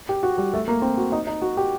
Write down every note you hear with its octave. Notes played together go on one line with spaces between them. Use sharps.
G4
F#4
G3
A3
A#3
C4
F#4
D#4
D#4
F#4
G4